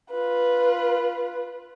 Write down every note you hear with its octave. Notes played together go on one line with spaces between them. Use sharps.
F4 B4